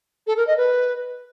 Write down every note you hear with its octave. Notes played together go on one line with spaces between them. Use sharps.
A4
A#4
D#5
B4